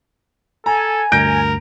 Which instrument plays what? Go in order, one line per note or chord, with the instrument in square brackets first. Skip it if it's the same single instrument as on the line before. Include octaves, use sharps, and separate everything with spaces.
[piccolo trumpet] A4 [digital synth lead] G#5 [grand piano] A#5
[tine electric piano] D2 G2 [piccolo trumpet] A#4 [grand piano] G6 A#6 D7